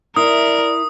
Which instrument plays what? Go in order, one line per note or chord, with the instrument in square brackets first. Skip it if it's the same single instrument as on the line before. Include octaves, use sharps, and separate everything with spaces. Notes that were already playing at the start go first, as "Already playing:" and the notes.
[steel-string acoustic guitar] E4 [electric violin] A#4 [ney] D5 [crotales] D#6